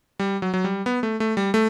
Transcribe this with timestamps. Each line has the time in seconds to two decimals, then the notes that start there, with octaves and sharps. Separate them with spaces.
0.19 G3
0.42 F#3
0.54 F#3
0.64 G3
0.86 B3
1.03 A3
1.20 A3
1.37 G3
1.54 A3